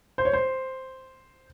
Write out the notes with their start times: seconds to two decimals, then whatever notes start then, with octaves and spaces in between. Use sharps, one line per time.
0.18 C5
0.25 C#5
0.33 C5